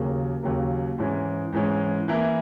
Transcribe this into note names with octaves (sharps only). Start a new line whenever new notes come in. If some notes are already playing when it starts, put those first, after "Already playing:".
Already playing: D#2 C#3 F#3 A#3
D#2 C#3 F#3 A#3
G#2 E3 G#3 C#4
G#2 E3 G#3 C#4
E3 A#3 E4